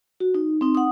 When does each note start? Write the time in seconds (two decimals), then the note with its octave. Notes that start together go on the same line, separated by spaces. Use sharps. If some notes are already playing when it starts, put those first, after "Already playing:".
0.20 F#4
0.34 D#4
0.61 C4 D#4
0.75 F#5 D#6